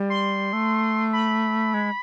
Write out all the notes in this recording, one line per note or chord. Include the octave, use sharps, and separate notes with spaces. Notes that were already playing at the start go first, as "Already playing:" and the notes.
Already playing: G3
C6
A3
B5
G#3